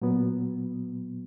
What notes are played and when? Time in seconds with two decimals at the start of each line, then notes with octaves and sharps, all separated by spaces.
0.02 A#2 F#3 B3